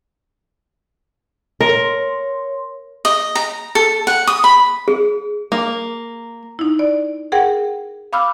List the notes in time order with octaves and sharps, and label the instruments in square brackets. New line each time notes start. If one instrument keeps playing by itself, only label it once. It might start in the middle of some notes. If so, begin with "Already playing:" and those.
[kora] A#4 [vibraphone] C#5 C6
[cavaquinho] D#5
A#5
A4
F#5
D#6
B5
[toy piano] G#4
[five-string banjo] A#3
[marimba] D#4 E4
D5
G#4 A#4 F#5 G5
F5 B5 D6 E6 F6